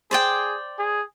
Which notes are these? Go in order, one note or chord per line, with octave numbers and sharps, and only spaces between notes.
G#4 C5 D5 G5
G#4